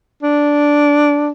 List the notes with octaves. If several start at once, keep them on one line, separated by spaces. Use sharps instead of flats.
D4